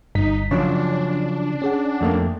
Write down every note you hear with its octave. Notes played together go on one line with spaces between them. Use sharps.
G1 G2 D#4 B6
C#3 F3 F#3 D4 C#5
C#4 G#4 F#5
F2 A3 A#3